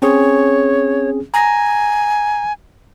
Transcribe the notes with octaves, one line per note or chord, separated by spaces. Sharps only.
C4 C#4 G#4 C#5
G#5 A#5 A#6